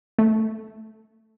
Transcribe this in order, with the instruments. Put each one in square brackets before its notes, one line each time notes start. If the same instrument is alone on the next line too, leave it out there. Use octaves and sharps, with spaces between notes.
[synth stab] A3